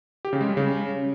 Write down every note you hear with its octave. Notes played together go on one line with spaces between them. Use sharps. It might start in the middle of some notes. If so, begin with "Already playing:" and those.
G4
C#3
G#3
G3
C#3